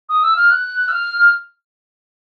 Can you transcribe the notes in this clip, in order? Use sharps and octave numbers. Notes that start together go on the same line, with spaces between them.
D#6
E6
F6
F#6
E6
F6